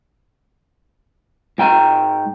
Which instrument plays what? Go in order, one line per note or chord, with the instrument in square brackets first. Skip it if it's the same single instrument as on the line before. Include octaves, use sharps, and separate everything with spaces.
[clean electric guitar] G#2 G5 A#5